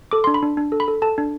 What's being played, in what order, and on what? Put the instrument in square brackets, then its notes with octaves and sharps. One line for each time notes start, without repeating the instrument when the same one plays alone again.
[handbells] A4 D6
C6
D4
B5
D4
D4
A4
B5
A4
A4 A5
D4